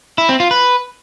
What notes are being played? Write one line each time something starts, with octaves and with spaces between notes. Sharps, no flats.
E4
C4
F4
B4